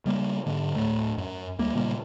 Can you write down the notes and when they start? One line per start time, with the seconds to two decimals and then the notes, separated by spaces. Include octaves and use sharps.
0.05 C#3 G3 A#3
0.46 G#2 D3
0.75 D1 A2 A3
1.18 F#2
1.59 D2 G3 A#3
1.75 A#2 C#3 G3 A#3